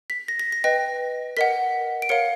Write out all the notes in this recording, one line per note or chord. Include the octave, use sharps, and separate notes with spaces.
B6
A#6
A#6
A#6
B4 D#5 G5 A#6
A#4 D#5 F#5 B6
D7
A#4 C#5 F5 C#7